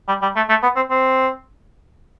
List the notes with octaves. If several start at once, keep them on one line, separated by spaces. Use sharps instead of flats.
G3
G3
A3
A3
B3
C4
C4